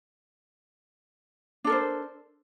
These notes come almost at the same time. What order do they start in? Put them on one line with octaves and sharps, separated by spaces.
D4 A4 A#4 C5